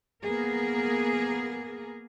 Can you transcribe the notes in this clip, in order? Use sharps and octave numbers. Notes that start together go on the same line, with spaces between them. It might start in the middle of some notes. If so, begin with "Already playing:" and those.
A#3 B3 G#4 A#4